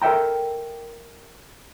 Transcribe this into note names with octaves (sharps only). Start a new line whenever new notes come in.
A4 A#4 D#5 E5 G5 A#5